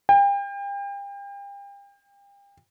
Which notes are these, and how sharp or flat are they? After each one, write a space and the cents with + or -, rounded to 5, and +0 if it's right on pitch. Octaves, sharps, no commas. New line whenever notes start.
G5 +35